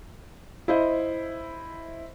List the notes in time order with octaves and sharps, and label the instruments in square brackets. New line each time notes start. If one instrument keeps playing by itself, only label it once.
[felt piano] E4 C5 D#5